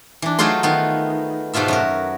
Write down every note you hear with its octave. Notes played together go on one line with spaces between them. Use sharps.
E3 D4
F#3 A3 D#4 F4 G#4 C6
D#3 B3 F4
G#2 B2 A3 F4 E5
F#2 F#4 A#4